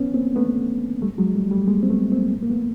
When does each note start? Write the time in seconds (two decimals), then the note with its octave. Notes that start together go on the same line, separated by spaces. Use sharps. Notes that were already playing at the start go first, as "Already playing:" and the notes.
Already playing: B3 C#4
0.14 A#3 C4
0.36 A3 B3
1.02 G3 A3
1.18 F#3 G#3
1.35 G3 A3
1.51 G3 A3
1.68 G#3 A#3
1.83 C4
1.90 A3 B3
2.12 A#3 C4
2.42 A#3
2.50 A3 B3